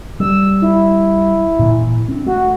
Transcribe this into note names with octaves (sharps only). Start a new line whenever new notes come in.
G3 E6
E4
A#2 E3
C4 D4
A3 F#4